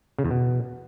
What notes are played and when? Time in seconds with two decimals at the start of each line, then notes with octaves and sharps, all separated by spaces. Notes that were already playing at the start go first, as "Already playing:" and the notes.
0.18 C#3
0.25 E2
0.31 B2